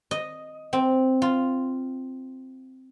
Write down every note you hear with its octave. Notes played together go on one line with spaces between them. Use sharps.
D#5
C4
F4